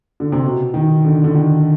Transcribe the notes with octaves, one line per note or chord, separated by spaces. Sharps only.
D3
C3
B2
D#3
D3
D3
D#3